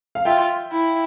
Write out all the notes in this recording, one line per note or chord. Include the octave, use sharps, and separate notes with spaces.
F5
F4 E5 G5
E4